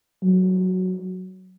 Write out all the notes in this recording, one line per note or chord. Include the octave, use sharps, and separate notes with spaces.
F#3